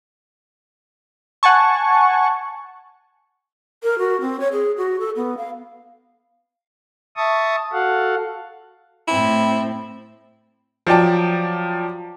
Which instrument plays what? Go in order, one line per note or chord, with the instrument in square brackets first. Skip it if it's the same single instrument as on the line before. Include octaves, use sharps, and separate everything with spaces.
[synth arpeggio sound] F#5 G#5 A5 C#6
[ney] A#4
F#4
C4
C#5
G#4
F#4
A4
B3
F5
[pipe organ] E5 A5 C#6 D#6
F#4 A4 F5 F#5
[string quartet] A2 C4 [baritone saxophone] E4
[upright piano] F3 F#3 D5 G5 A5